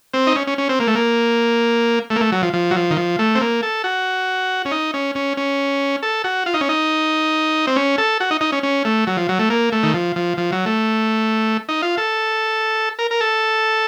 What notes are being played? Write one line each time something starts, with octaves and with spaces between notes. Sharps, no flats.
C4
D#4
C#4
C#4
C#4
C4
A#3
A3
A#3
A3
A#3
A3
F#3
F3
F3
F#3
F3
D#3
F3
A3
C4
A#3
A4
F#4
C#4
D#4
C#4
C#4
C#4
A4
F#4
F4
D#4
C#4
D#4
C4
C#4
A4
F#4
D#4
D#4
C#4
C#4
A3
F#3
F3
F#3
A3
A#3
A3
D#3
F3
F3
F3
F#3
A3
D#4
F4
A4
A#4
A#4
A4